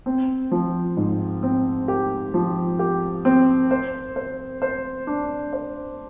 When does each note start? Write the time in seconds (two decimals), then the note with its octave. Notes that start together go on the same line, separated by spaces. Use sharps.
0.06 C4
0.51 F3
0.97 G#2
1.43 C4
1.88 G4
2.34 F3
2.79 G4
3.25 C4
3.71 C5
4.16 C5
4.62 C5
5.07 D4
5.53 C5